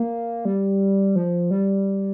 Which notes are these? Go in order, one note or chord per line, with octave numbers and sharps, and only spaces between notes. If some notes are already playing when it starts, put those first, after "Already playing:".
Already playing: A#3
G3
F3
G3